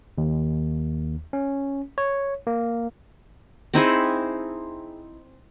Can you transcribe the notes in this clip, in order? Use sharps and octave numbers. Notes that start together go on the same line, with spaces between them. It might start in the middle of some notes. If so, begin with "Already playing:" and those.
D#2
C#4
C#5
A#3
C4 D#4 E4 G#4